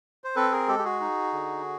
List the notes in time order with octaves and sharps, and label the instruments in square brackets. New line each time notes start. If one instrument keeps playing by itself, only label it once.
[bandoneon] C5
C4 A4 B4
G#4 A#4
G#3 G4 A4
G4
F#4 G#4
D#4
D3